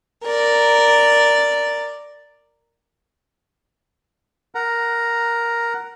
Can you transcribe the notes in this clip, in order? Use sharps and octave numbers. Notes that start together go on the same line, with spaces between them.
A#4 D5
A#4 F#5 A#5